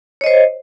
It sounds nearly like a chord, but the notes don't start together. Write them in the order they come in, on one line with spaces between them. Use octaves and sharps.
C#5 D#5 C5